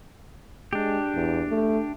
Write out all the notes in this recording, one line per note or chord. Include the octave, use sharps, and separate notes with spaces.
G#3 D4 G4
E2
A3